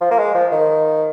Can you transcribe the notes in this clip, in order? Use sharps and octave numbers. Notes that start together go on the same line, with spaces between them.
F3
A#3
G#3
F3
D#3